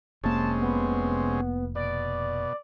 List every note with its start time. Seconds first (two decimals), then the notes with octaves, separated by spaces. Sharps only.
0.24 F1 C3 G#3 A#3 C#4 A5
0.61 B3
1.75 B2 D5